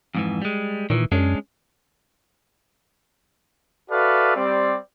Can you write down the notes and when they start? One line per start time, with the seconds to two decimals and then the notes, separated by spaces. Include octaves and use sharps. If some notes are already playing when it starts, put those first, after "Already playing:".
0.15 F2 G#2 E3
0.42 G3 G#3
0.90 A#2 D#3 E3
1.12 F#2 G#3 C#4 D4
3.91 F#4 A4 B4 D5 E5 F5
4.36 G3 C4 D5